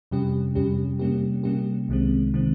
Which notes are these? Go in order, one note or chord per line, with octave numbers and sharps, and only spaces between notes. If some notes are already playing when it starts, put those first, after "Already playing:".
F2 C3 G3 C#4 G4
F2 C3 G3 C#4 G4
C3 G3 A#3 C#4 G4
C3 G3 A#3 C#4 G4
C2 C3 D#3 G#3 C4
C3 D#3 G#3 C4